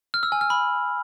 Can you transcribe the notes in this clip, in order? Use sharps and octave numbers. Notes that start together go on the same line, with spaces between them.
F6
E6
G#5
F6
B5